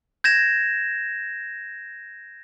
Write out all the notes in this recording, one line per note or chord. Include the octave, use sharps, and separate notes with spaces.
G6 G#6 A#6 E7